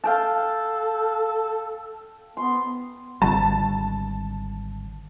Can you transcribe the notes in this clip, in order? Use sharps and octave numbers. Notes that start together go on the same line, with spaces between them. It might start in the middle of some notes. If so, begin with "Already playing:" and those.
A4 F5 G5 A5
B3 C6
G#1 D3 G3 A5